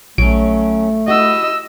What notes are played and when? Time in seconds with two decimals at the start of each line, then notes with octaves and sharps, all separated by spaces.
0.18 A#1 F#3 A3 C#4 D7
1.08 E4 F#4 D#5 E6